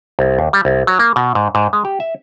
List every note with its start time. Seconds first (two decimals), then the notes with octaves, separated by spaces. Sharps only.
0.19 C2
0.39 D#2
0.53 G3
0.65 C2
0.87 F#3
0.99 A#3
1.16 B2
1.35 G#2
1.55 G#2
1.73 G#3
1.85 G4
2.00 E5